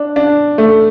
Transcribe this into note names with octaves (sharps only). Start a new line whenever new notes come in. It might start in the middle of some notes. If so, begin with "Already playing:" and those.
Already playing: D4
D4
A3